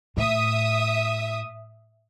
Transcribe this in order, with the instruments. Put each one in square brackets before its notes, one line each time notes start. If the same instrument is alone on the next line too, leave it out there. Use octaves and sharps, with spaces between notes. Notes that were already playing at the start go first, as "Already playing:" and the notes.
[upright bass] A2 [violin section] E5 D#6